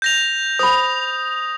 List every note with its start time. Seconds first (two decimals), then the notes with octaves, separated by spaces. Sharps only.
0.02 G6 A#6 F7
0.59 C5 B5 D#6